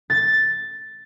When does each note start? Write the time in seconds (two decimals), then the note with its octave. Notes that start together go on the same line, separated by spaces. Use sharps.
0.10 A6